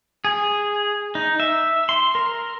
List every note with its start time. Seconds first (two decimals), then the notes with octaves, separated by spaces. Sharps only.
0.25 G#4
1.15 D#4
1.40 E5
1.89 C6
2.15 A#4